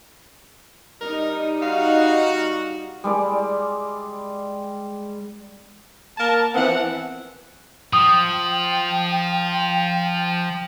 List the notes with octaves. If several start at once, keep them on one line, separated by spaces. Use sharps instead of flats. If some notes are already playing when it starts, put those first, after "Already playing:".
G3 D#4 A#4
F#4 F5
G3 G#3 D5
A#3 A#4 A5
E3 F3 B3 C4 F#5
F3 G5 D#6